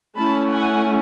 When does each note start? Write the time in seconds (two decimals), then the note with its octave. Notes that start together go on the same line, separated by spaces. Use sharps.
0.16 A3 C#4 E4 A5 B5
0.51 F#5 G#5